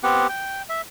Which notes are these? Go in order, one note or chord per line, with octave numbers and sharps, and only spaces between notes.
B3 C4 G4 F#5
G5
E5